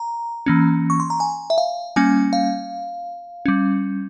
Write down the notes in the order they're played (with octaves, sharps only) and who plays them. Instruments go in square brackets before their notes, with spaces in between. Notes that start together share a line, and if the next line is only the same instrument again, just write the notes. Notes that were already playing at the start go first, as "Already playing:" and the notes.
Already playing: [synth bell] A#5
E3 A#3 C#4
C#6
C6
A#5
G#5
E5
F5
G3 A#3 C#4 G#5
F5
G3 C#4